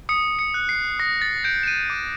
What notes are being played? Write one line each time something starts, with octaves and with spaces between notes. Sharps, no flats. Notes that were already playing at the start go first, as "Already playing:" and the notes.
D#6 C#7
C#7
F#6
C7
D#6 A#6
A6
G6 D7
E7
D#7
D6